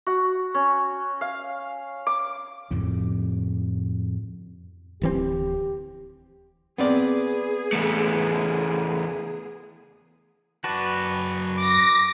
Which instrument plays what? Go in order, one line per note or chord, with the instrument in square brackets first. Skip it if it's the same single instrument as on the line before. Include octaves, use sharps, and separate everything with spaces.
[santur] F#4
C#4
F5
D6
[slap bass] F2 A2 C#3
[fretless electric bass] D1 E3 C4 [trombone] G4
[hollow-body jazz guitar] B3 C4 D5 [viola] G#4
[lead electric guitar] E2 A3
[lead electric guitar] F#2 A5 [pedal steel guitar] F#4 B4 D5
[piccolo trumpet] D6 [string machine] A#6